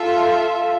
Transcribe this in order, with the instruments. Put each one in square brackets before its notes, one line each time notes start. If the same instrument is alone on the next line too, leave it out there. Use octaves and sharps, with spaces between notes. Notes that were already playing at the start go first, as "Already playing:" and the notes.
Already playing: [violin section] F4 A4 E5 [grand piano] F5